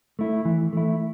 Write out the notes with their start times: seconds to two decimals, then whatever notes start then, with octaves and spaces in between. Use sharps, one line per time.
0.19 A3 E4
0.45 E3
0.73 A3 E4